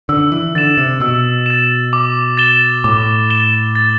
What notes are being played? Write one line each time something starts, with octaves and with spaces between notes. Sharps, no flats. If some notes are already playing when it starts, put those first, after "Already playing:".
D3 E6
E3
D3 A6 E7
C3
B2 E6
A6 E7
D6
A6 E7 G7
A2 D6
A6 E7 G7
A6